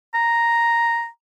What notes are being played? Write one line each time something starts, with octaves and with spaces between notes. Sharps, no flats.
A#5